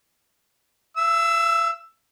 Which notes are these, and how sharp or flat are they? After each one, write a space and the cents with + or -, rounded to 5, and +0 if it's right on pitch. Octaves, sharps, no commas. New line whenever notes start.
E5 +45 E6 +0